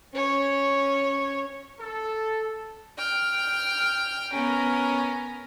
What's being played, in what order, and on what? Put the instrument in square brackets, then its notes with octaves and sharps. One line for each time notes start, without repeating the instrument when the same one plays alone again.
[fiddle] C#4 C#5
[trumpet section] A4
[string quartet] G5 F6
B3 C#4 A#4